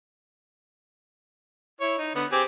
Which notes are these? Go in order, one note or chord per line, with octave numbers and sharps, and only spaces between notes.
E4 C#5
D#4
D3 B3
C4 G4 G#4